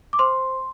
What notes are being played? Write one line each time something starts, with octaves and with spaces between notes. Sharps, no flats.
D6
C5 C6